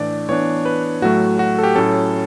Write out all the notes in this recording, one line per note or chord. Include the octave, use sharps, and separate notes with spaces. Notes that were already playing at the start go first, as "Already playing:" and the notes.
Already playing: A2 E3 A3 D4 D5
E3 B3 D4 C#5
B4
A2 F#3 A3 F#4
F#4
A4
G4
A2 F#3 C#4 A4